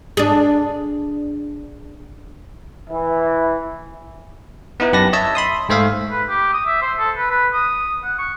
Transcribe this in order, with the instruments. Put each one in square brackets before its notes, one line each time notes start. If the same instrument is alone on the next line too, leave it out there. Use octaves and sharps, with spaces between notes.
[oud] D4 G#4
[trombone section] E3
[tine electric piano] B3 D#4 E4 B4
F#2 G4 B4 A5 A#6
C#5 D#5 E5 A5 E6
B5 C6 D#6
G#2 A3 C5 E5 F5
[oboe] B4
G4
D#6
E5
C5
A4
B4
B4
D#6
F#5
C#6